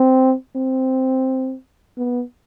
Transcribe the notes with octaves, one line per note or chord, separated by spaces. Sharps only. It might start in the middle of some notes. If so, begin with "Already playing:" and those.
Already playing: C4
C4
B3